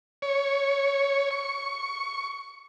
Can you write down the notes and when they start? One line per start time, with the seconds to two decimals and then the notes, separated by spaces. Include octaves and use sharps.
0.22 C#5
1.31 C#6